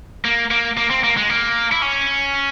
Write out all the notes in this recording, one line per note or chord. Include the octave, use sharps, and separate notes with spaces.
A#3
A#3
A#3
C4
A#3
G#3
A#3
E4
C#4